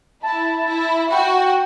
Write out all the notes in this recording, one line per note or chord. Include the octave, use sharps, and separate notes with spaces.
E4 A5
E4
F#4 G5